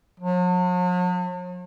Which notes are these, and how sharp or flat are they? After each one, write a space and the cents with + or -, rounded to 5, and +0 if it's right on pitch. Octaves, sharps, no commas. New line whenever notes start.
F#3 -45